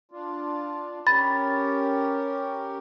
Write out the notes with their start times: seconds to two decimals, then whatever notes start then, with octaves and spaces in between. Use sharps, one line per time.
0.11 D4 F4
1.07 C#4 G4 A#4 B5 A6